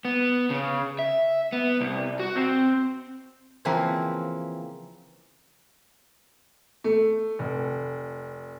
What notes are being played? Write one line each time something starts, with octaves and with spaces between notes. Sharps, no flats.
B3
C#3
E5
B3
C2
F#4
C4
C#3 E3 F3 A#3 C4 B4
A3
F1